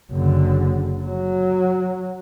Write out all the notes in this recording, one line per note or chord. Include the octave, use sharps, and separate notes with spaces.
F#1 D3
F#3